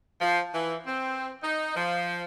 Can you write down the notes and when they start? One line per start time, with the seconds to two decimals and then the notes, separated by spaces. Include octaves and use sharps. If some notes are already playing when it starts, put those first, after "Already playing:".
0.21 F3
0.53 E3
0.87 C4
1.43 D#4
1.76 F3